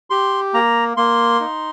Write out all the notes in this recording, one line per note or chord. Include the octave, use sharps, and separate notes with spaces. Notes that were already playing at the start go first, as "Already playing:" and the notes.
G4 C6
A#3 A#5
A#3 C6
D#4